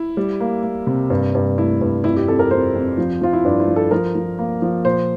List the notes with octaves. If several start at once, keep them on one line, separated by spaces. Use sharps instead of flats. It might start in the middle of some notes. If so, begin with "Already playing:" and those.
Already playing: E4
G3
A#3
A#3
C3
G2
G2
A3 E4
G2
F2 E4
G4
F2 A4
A#4
F2 C5
F2
F3
F3 F4
E4
G2 D4
E4
F3
A4
F3 A#4
F3
A#3
F3
A#2 C5